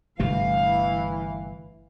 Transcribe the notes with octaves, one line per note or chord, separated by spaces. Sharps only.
G1 C3 E3 A3 F5